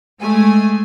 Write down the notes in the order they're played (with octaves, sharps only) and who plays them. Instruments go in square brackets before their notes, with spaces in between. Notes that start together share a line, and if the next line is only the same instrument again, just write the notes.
[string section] G#3 A3 G#5